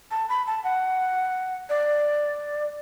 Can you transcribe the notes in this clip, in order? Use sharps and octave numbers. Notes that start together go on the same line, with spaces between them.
A5
B5
A5
F#5
D5